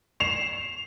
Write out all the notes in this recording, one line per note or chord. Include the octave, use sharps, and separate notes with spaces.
C7 E7 F7